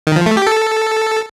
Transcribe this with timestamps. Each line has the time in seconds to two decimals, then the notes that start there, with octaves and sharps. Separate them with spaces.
0.07 D#3
0.16 F3
0.26 A3
0.37 G4
0.47 A4